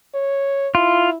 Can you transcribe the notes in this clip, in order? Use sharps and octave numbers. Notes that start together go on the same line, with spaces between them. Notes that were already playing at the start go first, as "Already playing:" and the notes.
C#5
E4 F4